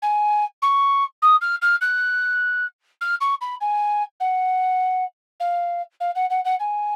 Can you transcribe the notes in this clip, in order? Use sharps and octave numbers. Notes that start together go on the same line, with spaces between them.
G#5
C#6
D#6
F6
F6
F#6
F6
C#6
B5
G#5
F#5
F5
F5
F#5
F#5
F#5
G#5